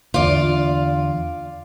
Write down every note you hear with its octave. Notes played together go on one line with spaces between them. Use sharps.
E2 D3 F4 D5